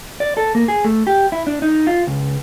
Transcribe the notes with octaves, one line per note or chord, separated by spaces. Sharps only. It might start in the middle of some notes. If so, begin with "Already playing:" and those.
D5
A4
A#3
G#4
A3
G4
E4
D4
D#4
F4
C#2